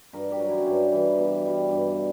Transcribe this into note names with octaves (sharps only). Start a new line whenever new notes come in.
G2 A#4
G4
F#3
E4
C#4
G2 D4
E3 G3
B2
G3
G2